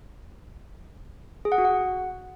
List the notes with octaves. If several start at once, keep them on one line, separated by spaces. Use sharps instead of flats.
G#4
F#5
F#4
F#5